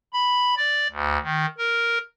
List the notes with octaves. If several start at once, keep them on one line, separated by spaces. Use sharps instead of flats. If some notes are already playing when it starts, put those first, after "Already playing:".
B5
D5
D2
D#3
A#4